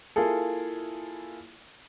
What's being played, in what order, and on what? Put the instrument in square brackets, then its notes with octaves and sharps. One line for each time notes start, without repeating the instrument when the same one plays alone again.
[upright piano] A#3 E4 F4 G#4 A4